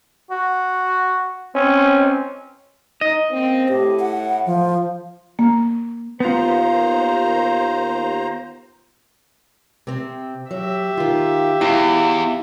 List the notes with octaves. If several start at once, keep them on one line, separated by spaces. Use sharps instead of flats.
F#4
C4 C#4
D#4 D#5
C#3 A#3 C4
A2 G4
F#5
F3
A#3
D#2 B3 F4 C5 A#5
C3 C4
F#3 G4 E5
D#3 F4
E2 E4 F5